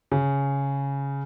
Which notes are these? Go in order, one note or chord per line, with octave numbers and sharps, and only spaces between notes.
C#3